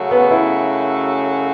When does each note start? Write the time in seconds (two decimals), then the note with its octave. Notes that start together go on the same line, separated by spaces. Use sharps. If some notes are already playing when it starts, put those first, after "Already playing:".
Already playing: F#2 C#3 F#3 A3 F#4
0.11 B3
0.31 E4